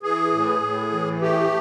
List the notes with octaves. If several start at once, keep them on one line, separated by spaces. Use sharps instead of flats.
E3 G#4
A2
A2
E3
A3 G4